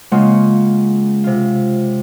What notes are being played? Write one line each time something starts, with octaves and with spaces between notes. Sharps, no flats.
C#3 G#3 A#3 F4 F#5 C6
C3 F4